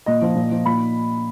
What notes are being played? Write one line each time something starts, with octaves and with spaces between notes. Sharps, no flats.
A#2 D#5
F3
A#2
F3
A#2 B5